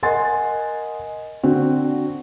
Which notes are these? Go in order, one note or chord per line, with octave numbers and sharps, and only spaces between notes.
A#4 D#5 F#5 G#5 C6 A6
D3 C4 F#4